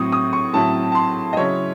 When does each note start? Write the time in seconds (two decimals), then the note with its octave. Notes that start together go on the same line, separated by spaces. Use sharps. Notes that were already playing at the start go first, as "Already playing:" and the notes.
Already playing: A2 F#3 C4 C#6 D#6
0.12 D#6
0.33 C#6
0.53 A2 F#3 C4 E4 A5
0.92 A5
0.95 C6
1.33 D#5
1.37 C#3 F#3 C#4 E4 C#5